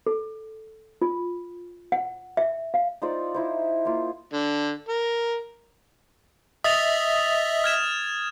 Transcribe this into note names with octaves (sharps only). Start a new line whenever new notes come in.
A4
F4
F#5
E5
F5
D#4 F4 C5 D5
D#4 E4 C5
A#3 F4
D3
A#4
D#5 E5 D#6 A6 F7
F6 G#6 E7